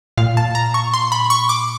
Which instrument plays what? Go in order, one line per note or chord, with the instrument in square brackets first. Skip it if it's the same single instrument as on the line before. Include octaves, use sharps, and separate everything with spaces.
[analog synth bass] A#2 [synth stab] F5
[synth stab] A5
A#5
C#6
C6
B5
C#6
D6